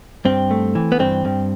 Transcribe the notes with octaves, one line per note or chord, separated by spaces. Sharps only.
G2 C4
A3
E3
B3
G2 C4
G2